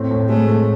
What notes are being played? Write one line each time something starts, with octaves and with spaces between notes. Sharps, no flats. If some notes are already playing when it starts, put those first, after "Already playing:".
Already playing: A2 C4
A2
G#3 A3
A2